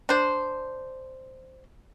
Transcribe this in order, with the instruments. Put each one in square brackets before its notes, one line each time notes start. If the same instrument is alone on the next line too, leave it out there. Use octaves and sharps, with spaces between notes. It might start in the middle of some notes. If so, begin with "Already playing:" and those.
[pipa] D4 C5